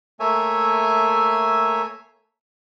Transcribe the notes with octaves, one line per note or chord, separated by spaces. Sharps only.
A3 A#3 C#5 E5 G#5